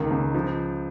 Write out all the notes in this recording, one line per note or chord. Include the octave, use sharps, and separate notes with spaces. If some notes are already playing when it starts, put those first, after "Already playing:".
Already playing: C#2 D#3
C#2
F3